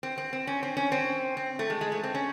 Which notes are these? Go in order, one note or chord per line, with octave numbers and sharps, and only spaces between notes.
C4
C4
C4
C#4
C4
C#4
C4
C4
A3
G#3
G#3
A3
C4
C#4